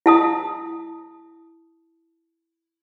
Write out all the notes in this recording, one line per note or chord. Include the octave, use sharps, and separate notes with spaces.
E4 A5 D#6